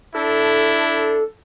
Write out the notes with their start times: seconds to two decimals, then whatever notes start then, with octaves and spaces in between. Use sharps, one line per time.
0.15 D4 E4 A4